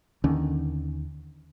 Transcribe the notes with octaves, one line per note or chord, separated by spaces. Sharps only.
D#2 D3 D#3 C#4